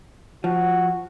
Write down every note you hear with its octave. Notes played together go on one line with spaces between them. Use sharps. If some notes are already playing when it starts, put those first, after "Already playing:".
F3 F#4